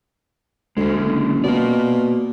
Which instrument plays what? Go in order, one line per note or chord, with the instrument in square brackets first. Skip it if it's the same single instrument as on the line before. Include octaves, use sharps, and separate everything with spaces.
[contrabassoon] D2 [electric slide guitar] D3 G#3
[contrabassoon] F#1
[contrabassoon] B2 [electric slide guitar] A#3 D5